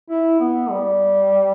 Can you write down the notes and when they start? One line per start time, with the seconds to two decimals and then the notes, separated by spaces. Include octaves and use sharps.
0.10 E4
0.40 B3
0.70 G3